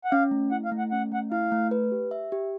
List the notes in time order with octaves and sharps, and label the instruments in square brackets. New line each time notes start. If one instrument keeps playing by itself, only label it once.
[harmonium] F#5
[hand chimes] C#4 [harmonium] F5
[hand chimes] A3
[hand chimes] E4 [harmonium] F#5
[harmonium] F5
[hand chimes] A3
[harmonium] F#5
[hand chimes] C#4 [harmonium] F#5
[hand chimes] A3 [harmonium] F#5
[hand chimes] E4 [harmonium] F5
[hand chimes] A3
B4
G4
E5
G4